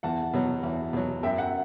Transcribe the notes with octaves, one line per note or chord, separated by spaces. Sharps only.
E2 F#5 A5
B2 F#3
E2
B2 F#3
F#2 E5 G5
F#5